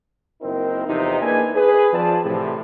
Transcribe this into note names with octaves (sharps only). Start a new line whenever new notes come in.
F#1 C4 D#4 E4 A#4
E2 C3 F3 D#4
A#3 D4 E4 G#4 B4 G#5
G#4 B4
F3 C4 D5 A5
A2 C3 E3